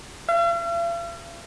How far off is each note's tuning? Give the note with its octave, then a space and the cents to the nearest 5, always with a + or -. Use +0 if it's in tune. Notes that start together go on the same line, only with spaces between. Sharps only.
F5 -45